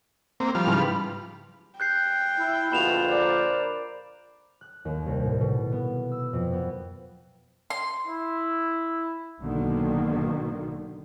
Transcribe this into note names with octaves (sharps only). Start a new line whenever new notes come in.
A#3 C4
F3 G3 F6
G#2 C#3 E3
B5
G5 F#6 G6 C7
E4
A#1 B2 D3 F4 B5 E7 F7
A#4 C5 D5
F#6
D#2
C2
A2
B2
B3
E6
F2
B3
C6
E4
B1 G#2 B2 D3 D#3 A#3